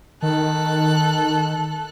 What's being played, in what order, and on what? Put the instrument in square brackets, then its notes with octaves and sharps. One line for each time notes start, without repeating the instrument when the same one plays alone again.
[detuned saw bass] D#3 [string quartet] A4 F#6